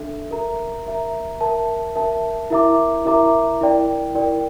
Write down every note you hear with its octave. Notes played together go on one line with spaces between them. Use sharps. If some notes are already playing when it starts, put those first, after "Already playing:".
Already playing: D4 A4 E5
A#4 E5 A#5
A#4 E5 A#5
A#4 E5 A5
A#4 E5 A5
E4 A#4 E5 A#5 D6
E4 A#4 E5 A#5 D6
E4 A#4 D5 G5
E4 A#4 D5 G5